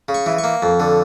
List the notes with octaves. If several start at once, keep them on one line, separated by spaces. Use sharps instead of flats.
C#3
C#6
E3
C#6
A#3
F2
D3